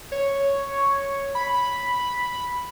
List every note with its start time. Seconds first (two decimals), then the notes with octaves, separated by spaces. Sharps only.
0.12 C#5
1.35 B5